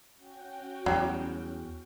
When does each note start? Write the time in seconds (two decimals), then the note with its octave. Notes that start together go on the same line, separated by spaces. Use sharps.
0.15 C#4 F#4 G5
0.86 E2 F#3 G3